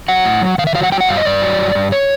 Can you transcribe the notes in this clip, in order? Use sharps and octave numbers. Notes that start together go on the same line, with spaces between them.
F#3 F#5
A2
F#3
D#3 F5
E5
F#3 F5
F#5
F#3 G5
F#5
G2 F5
D#5
G2 D5
F#3
G2
G2
C#5